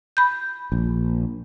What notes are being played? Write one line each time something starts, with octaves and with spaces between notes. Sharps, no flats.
B5 G6
A#1